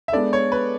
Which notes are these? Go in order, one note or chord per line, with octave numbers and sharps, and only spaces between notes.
E5
G#3 B3 D4 A4 D5
C#5
B4